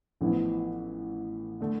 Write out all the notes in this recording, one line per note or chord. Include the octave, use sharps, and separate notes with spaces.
A1 A2 F3 B3 E4
D3 A3